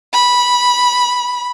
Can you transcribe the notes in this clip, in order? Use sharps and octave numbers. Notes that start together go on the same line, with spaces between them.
B5